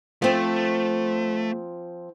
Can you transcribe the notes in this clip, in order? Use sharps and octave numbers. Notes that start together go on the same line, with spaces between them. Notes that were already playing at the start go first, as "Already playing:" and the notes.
F3 A3 C4